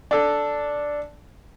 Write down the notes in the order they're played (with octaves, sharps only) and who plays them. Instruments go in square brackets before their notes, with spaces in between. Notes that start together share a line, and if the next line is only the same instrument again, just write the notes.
[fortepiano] D4 A4